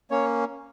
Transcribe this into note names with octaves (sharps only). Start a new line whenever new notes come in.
A#3 C#4 C#5